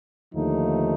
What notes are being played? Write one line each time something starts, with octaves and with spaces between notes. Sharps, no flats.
D#2 D3 F3 A3 D#4